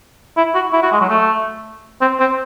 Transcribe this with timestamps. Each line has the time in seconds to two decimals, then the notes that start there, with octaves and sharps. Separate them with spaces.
0.37 E4
0.54 F#4
0.73 E4
0.82 F#4
0.91 G#3
1.00 F#3
1.09 A3
2.01 C4
2.19 C4